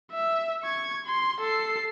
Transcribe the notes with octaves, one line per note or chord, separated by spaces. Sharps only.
E5
C#6 G#6
C6
A4 C7